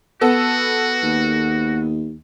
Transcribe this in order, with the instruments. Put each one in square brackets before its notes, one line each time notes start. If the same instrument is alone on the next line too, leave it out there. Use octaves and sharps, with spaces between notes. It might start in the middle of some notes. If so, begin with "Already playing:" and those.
[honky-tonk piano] B3 A4 [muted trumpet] F#4
[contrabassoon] D#2